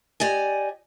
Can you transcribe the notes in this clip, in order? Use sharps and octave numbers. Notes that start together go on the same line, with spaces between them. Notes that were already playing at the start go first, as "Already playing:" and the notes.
G4 D5 D#5 G#5